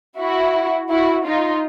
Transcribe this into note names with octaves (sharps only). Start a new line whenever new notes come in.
E4 F#4
E4 F#4
D#4 F4